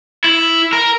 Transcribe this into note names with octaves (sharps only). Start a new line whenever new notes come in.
E4
A#4